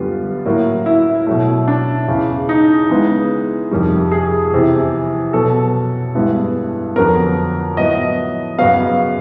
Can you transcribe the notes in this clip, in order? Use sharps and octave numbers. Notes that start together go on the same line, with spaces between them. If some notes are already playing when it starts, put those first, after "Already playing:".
Already playing: F#2 D3 G3 B3 F4
A2 F#3 A#3
E4
B2 F#3 A3
D4
E2 C#3 E3
D#4
C#3 E3 G#3 B3
F2 C3 D#3 G3
G#4
E2 C3 E3
B2 F#3 B3 A4
G2 E3 G#3 B3
F2 D3 F#3 B3 A#4
A2 F#3 B3 D#5
F#2 C#3 F#3 B3 F5